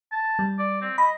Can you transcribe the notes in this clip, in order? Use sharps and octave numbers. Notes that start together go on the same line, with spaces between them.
A5
G3
D5
C4
D#5 B5